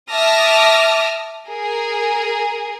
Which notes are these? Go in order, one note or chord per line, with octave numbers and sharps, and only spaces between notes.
E5 A5 D6 D#6 F6 A#6
G#4 A#4